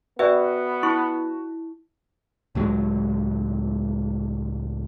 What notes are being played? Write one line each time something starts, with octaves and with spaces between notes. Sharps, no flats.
B3 F#4 B4 D5 E5 G5
E4 C#6
C#2 A2 F#3 G#3